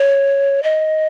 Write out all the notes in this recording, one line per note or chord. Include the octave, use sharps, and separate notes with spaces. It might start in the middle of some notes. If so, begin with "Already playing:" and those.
Already playing: C#5
D#5